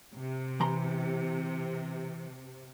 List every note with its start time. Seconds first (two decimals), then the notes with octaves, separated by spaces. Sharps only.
0.15 C3
0.60 E3 A#5 C6